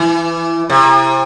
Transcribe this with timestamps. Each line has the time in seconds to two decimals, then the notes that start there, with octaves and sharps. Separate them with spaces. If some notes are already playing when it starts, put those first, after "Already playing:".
Already playing: E3
0.70 C3